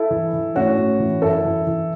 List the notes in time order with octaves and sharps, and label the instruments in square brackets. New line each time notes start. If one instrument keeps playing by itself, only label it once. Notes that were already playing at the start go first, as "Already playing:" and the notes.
Already playing: [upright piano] E4 A4
E3
E3
A2 C#4 F#4
A2
E3
F#2 E4 A4
E3
E3